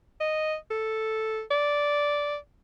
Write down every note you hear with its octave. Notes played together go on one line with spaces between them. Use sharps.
D#5
A4
D5